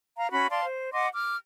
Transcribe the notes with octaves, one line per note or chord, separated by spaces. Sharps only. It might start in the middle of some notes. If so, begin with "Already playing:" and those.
F5 A#5
C#4 F#4 B5
D5 F5 A5 C6
C5
D#5 F#5 C6 D6
D6 F6